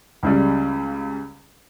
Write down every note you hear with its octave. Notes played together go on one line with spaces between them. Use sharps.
C#2 C#3 G3